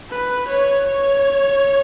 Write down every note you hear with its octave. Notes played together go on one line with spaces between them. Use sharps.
B4
C#5
C#5